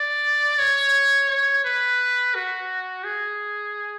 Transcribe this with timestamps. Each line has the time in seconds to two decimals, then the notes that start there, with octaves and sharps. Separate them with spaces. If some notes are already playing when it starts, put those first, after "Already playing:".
Already playing: D5
0.59 C#5
1.29 C#5
1.64 B4
2.35 F#4
3.04 G#4